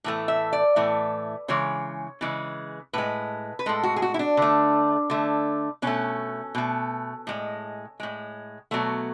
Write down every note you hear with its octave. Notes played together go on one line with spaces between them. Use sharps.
A2 E3 A3
E5
D5
A2 E3 A3
C#3 E3 G#3 C#5
C#3 E3 G#3
A2 G#3 B4
B4
A2 G#3 A4
F#4
G#4
F#4
E4
D4
D3 A3
D3 A3
B2 A3 C#4
B2 A3
A2 G#3
A2 G#3
B2 F#3 A3 B3